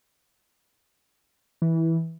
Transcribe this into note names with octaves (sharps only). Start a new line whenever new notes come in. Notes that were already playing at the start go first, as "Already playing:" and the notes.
E3